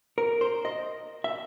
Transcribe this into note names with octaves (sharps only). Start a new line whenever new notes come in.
A#4
C5
D#5
E5